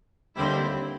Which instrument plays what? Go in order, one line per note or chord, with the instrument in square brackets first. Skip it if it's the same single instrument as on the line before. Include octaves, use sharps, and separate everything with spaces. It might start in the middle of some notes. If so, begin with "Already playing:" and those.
[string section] D#2 D3 G3 C4 E4